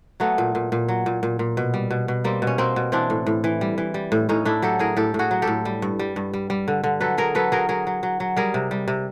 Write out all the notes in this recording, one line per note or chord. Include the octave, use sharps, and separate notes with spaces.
F#3 A3 B3
A#2
A#2
A#2
F#3
A#2
A#2
A#2
B2
G3
B2
B2
G3 A#3 C4
B2
C#4
B2 A#3 C4
B2
E3 C4 D4
A2
A2
E3
G3
E3
G3
A2
A2 C#4 D#4
A2 D4 E4
F#3 G4 A4
A2 G#4 A#4
A2 G4 A4
A2
F#4 G#4
F#3
G4 A4
A2
G3
G2
G3
G2
G3
G3
D3
D3
F#3 A4 B4
F#3 G#4 A#4
F#3 A4 B4
F#3 G#4 A#4
F#3 G#4 A#4
F#3
F#3
F#3
G3 G#4 A#4
C3
G3
C3